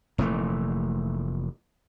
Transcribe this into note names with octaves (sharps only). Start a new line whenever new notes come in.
F1 A#2 E3 A3